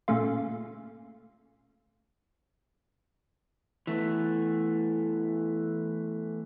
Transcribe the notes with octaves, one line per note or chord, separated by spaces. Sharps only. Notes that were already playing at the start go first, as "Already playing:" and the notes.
A#2 C#3 A3 F4
E3 A3 B3